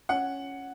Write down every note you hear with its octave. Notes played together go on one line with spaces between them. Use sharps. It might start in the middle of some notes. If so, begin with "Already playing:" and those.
C#4 F#5